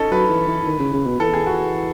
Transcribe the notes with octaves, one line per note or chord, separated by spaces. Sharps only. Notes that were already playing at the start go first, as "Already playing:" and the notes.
Already playing: C#4 D#4 A4
F#3 B4
E3
E3
D#3
C#3
C#3
B2
E3 A4
G#4
F#4